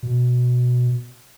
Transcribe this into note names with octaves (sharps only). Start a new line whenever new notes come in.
B2